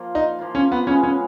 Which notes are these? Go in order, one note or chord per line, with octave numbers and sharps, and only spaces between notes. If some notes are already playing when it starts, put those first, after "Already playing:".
Already playing: F3 A#3 F4
D#4
F3 A#3 F4
C#4
B3
C#3 G#3 B3 C#4
C#4